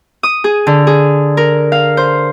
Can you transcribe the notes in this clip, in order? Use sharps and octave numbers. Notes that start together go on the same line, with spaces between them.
D#6
G#4
D3
G#4
A#4
F5
C5